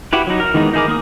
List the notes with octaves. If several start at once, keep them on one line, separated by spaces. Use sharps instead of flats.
E4 F#4 G4 B4
F#3 D#4
A#4
D#3 E3 G#3 B3 D#4
D#4 E4 G#4 A#4 D6
A#3 A#4 B5 D#6